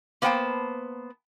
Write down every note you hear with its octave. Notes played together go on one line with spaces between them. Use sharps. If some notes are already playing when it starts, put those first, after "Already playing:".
A#3 B3 C5 F#5 G5 A5